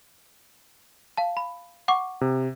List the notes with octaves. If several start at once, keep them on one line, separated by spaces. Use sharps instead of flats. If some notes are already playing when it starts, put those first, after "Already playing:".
F5 A5
B5
F#5 C#6 D6
C3